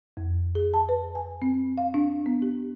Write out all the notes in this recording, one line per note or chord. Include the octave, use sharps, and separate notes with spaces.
F2
G#4
A5
B4
G#5
C4
F5
D4
B3
G4